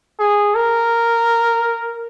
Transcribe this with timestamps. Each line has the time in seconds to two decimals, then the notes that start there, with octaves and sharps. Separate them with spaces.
0.20 G#4
0.55 A#4